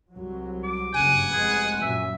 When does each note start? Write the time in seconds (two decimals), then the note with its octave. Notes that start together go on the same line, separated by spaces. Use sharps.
0.12 C2 F#3
0.64 D6
0.94 F#1 G2 C#3 F#5 G#5
1.33 F1 G#3 B3 G#4
1.82 F#2 A#2 F#3 E5